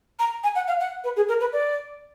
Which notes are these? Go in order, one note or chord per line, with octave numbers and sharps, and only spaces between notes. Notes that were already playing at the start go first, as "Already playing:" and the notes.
A#5
G#5
F#5
F5
F#5
B4
G#4
A#4
B4
D5